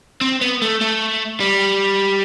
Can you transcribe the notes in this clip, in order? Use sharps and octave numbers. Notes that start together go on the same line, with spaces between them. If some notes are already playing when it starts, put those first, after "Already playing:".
C4
B3
A3
A3
G3